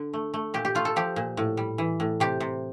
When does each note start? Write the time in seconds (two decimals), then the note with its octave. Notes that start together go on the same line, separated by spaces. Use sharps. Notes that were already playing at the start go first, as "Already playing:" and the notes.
Already playing: D3
0.13 A3
0.34 A3
0.54 A#2 G4
0.65 G4
0.75 A3 F4
0.85 A4
0.96 F3 G4
1.16 A#2
1.37 A2
1.57 G3
1.78 E3
2.00 A2
2.20 C3 G4
2.40 C3